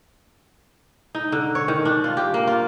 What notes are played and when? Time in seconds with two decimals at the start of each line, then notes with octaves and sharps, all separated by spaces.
1.15 D#4
1.32 D3
1.55 C#5
1.68 D#3
1.85 D4
2.04 F4
2.17 G4
2.34 A#3
2.47 F4